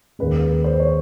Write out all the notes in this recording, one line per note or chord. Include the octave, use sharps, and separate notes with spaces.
D#2 D#3 G#3 B4
C5
C#5